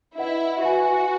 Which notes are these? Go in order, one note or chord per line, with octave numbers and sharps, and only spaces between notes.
E4 B4 D#5 F#5
F#4 B4 E5 G#5